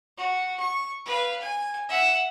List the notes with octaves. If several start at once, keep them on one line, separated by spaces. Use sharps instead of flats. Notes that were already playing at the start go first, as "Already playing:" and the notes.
F#4
C#6
B4 F5
G#5
E5 F#5